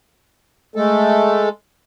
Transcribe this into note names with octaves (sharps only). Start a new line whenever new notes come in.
G#3 A3 A4